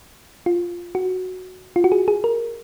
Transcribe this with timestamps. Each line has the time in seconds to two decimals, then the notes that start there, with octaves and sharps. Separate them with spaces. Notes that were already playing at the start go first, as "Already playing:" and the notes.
0.46 F4
0.95 F#4
1.76 F4
1.84 F#4
1.92 G#4
2.08 G#4
2.24 A#4